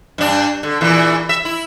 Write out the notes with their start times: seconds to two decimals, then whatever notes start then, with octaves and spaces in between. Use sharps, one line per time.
0.18 G2 D4
0.63 D3
0.81 E2 A#2 E3
1.29 E5
1.45 E4